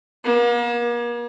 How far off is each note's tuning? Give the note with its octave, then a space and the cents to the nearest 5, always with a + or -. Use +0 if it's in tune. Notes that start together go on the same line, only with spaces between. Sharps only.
A#3 +40